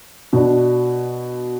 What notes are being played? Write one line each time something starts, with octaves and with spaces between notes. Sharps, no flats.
B2 D4